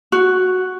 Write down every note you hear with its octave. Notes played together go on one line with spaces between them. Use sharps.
F#4